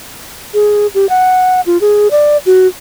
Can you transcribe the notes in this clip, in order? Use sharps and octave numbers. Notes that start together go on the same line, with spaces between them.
G#4
G4
F#5
F4
G#4
D5
F#4